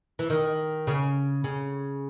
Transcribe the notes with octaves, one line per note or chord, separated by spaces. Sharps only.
E3
D#3
C#3
C#3